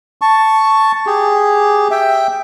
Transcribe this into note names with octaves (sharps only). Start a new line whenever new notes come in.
A5 C#6
G4 G#4
E5 G5